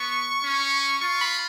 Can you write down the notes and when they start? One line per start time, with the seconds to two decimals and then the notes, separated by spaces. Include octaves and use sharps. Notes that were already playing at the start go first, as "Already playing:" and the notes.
Already playing: B3 C#6
0.44 C#4
1.02 F4 C#6
1.21 B5